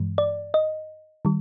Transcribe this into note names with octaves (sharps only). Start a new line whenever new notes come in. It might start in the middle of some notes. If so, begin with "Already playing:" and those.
Already playing: G2 E3 G#3
D5
D#5
D#3 G3